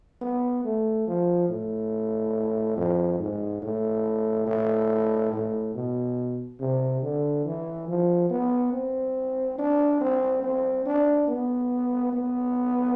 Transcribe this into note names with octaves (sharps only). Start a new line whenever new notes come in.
B3
A3
F3
A2
F2
G#2
A2
A2
A2
B2
C3
D3
E3
F3
B3
C4
D4
C4
C4
D4
B3
B3